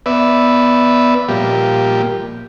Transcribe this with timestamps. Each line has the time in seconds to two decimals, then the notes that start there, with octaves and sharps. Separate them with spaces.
0.06 B3 B4 D5 E5
1.29 A#2 F3 G3 A#3 G4